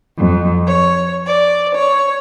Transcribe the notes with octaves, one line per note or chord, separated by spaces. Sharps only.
F2
C#5
D5
C#5